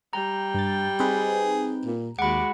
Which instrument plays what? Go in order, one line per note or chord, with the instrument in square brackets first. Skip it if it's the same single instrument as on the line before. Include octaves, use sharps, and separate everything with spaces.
[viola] G3 G5 [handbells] A#5
[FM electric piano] G2 A6
[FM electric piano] C4 D#4 B4 [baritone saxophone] G#4
[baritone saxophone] A#2
[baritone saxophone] D#2 [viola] G#3 F#4 [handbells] F#5 B5 [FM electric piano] D6